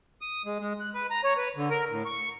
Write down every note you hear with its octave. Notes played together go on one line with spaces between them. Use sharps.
D#6
G#3
G#3
F#6
B4
A#5
C#5
B4
D3
A#4
A2
C#6